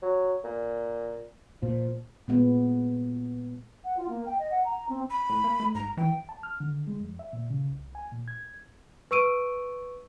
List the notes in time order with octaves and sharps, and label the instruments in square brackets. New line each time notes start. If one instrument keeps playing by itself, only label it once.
[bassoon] F#3
A#2
[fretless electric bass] A#2 [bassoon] F3
[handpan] A#2 G#3 B3
[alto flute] F#5
F4
A#3
G5
D#5
F#5
A#5
C4
[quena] B5
[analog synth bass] A2
A#3
A3
[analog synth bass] G#1 [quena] A#5
[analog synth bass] E3 [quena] G5
[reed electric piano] A5
F6
D3
G#3
F2
E5
A#2
C#3
C2
G#5
A#2
G#6
[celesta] B4 C#6 E6 D7 D#7